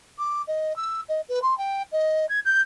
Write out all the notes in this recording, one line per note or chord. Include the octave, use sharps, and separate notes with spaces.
D6
D#5
E6
D#5
B4
C6
G5
D#5
G#6
G6